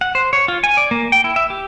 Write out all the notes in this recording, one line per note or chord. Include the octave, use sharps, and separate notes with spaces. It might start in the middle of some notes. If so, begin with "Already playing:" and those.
F#5
C5
C#5
F4
G#5
D5
A#3
G5
E4
E5
G4